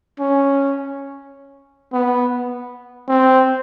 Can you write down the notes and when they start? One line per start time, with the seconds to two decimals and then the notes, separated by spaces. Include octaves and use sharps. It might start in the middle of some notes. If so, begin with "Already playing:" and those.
0.20 C#4
1.93 B3
3.08 C4